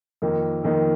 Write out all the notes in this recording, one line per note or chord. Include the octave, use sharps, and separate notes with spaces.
F2 D#3 A#3 D#4
F2 D#3 A#3 D#4